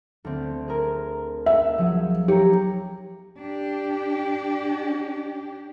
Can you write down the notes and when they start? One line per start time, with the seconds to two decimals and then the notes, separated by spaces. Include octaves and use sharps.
0.25 D2 C4
0.68 G#4 A#4
1.46 E5
1.78 F3 F#3 G#4
2.28 G4 C#5 A#5
3.39 D4 G4